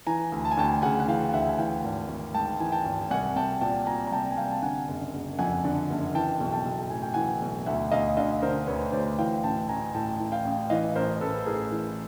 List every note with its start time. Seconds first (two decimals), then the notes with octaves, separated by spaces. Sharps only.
0.07 E3 G#5 A#5
0.32 D2
0.45 A5
0.51 G#5
0.57 D2 G5 A5
0.82 C#3 F#5 G#5
1.00 F#5
1.08 E3 F5 G5
1.33 D2 E5 F#5
1.49 G#5
1.58 E3 F5 G5
1.84 G#1
2.09 G#1
2.34 G#2 G5 A5
2.60 E3 G#5
2.72 G5 A5
2.85 G#1
3.10 C2 F#5 G#5
3.36 C2 G5 A5
3.61 A#2 G5 A5
3.86 A#2 G#5 A#5
4.07 A#5
4.12 C2 G5 A5
4.31 G#5
4.37 C2 F5 G5
4.51 A5
4.62 D3 F#5 G#5
4.88 F#1
5.13 F#1
5.39 F2 F#5 G#5
5.65 D3
5.89 F#1
6.15 E3 G5 A5
6.40 B1
6.53 G5 A5
6.65 B1
6.90 A2 G#5
7.02 G5
7.14 E3 F#5 G#5
7.42 B1
7.66 D2 E5 F#5
7.92 D2 D#5 F5
8.17 D3 D#5 F5
8.42 D3 A#4 C5
8.67 D2 B4 C#5
8.93 D2 C5 D5
9.18 E3 F5 G5
9.44 A1 G5 A5
9.69 A1 G#5 A#5
9.95 A2 G5 A5
10.20 E3
10.32 F5 G5
10.45 A1
10.70 E3 D#5 F5
10.96 A1 A#4 C5
11.21 A1 A4 B4
11.46 A2 G#4 A#4
11.72 E3